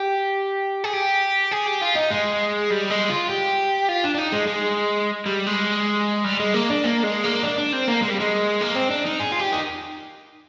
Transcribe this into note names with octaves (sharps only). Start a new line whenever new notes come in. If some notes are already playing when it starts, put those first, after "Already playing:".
Already playing: G4
G#4
G4
G#4
G4
F4
D#4
G#3
G3
G#3
F4
G4
F4
D4
D4
D#4
G#3
G#3
G3
G#3
G3
G#3
A#3
D4
A#3
G#3
A#3
D4
D4
C4
A#3
G#3
G3
G#3
A#3
C4
D4
D#4
G#4
F4
G4
D#4